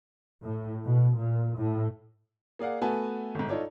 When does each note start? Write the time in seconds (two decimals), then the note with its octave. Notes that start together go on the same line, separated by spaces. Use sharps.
0.44 A2
0.84 B2
1.18 A#2
1.57 A2
2.59 A#3 G#4 D5 F5 F#5
2.82 A3 B3 F#4 B4 G#5 A5
3.35 G1 G#2
3.49 D#4 F4 A4 C#5 D5